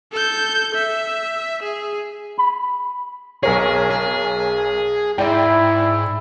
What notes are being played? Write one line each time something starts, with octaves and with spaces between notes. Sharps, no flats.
A4 G6
E5
G#4
B5
B1 G#4 A#4 C#5
G#4
G#2 E4 D5 G5